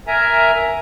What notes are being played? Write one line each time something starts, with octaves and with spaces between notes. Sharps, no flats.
A#4 E5 G#5 A#5